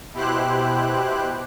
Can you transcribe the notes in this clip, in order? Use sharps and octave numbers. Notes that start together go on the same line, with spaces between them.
B2 E4 G4 C5 F#6